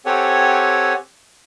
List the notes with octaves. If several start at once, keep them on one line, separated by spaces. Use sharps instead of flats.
C4 G4 A4 C#5 F#5 G#5